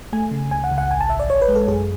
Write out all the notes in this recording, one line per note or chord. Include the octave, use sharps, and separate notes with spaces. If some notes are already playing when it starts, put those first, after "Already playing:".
A3 G#5
C#3
C#2 G#5
F#5
C#2
F#5
A1 G#5
A5
A1 E5
D5
A1 C#5
B4
G#3
A4
F#2 G#4